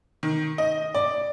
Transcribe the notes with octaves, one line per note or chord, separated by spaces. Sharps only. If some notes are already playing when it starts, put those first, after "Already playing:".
D#3
D#5
D5